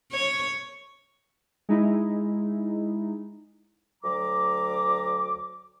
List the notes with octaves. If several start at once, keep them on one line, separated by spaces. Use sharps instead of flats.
C#5
G#3 D#4 E4
D2 F#3 A#5 D6